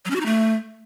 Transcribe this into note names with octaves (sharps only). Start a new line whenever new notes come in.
F#3
C#4
F#4
D#4
A3